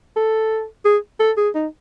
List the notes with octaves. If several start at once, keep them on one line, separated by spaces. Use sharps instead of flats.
A4
G#4
A4
G#4
D#4